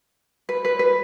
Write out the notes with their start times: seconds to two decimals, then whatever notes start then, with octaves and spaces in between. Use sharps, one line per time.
0.49 B4
0.65 B4
0.79 B4